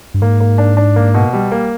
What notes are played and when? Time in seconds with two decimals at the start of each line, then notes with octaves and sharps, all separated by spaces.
0.14 G2
0.21 G#2 A#3
0.40 A#3
0.58 D4
0.77 D4
0.96 A#3
1.14 B2
1.33 G3
1.52 A#3